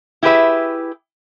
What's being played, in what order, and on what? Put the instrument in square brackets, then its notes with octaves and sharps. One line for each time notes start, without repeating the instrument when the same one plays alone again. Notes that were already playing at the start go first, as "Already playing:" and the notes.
[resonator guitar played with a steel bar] E4 G4 G#4 B4 E5